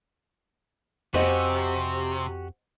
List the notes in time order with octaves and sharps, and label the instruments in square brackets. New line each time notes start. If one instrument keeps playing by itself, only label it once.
[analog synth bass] F2 [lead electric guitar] C3 [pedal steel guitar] F#4 G4 G#5 [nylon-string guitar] C5 D#5 F#5